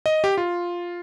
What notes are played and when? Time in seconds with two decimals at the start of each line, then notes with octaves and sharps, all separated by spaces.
0.06 D#5
0.24 G4
0.38 F4